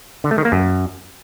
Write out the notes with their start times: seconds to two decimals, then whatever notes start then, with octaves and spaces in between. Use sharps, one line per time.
0.24 D3
0.31 A3
0.38 D#3
0.45 A#3
0.52 F#2